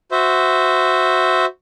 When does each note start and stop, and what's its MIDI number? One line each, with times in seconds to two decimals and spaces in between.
0.12 1.45 66
0.12 1.45 72
0.12 1.45 76